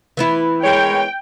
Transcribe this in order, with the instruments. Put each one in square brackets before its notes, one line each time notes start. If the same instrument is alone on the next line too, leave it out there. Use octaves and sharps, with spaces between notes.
[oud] E3 B3 E4
[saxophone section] G#3 A#4 C#5 [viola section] G5